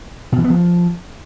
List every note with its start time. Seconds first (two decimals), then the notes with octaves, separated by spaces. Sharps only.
0.32 B2
0.38 E3
0.44 B3
0.50 F3